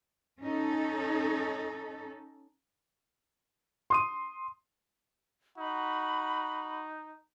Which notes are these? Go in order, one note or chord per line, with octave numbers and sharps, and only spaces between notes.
C#4 D#4 A4
C6 D#6 D#7
D#4 F#4 B5